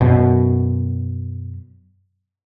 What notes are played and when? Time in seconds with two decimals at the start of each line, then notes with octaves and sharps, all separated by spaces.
0.01 F#2 B2